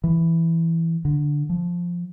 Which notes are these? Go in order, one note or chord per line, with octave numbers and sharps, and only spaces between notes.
E3
D3
F3